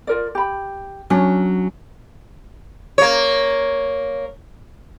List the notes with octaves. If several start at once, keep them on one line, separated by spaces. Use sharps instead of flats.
F4 A#4 D5
G4 B5
F#3 C#4 D4 C#5
A#3 C#5